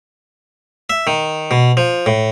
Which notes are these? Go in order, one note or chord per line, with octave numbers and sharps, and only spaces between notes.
E5
D#3
B2
F3
A2